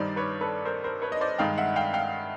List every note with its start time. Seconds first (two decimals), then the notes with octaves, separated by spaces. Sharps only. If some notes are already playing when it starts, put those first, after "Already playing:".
Already playing: G2 D#3 G3 C5 D5
0.16 B4 C#5
0.41 A4 B4
0.65 A#4 C5
0.84 A#4 C5
1.02 B4 C#5
1.12 D#5
1.21 C5 D5
1.38 G2 D#3 G#3 F5 G5
1.58 E5 F#5
1.76 F5 G5
1.94 F5 G5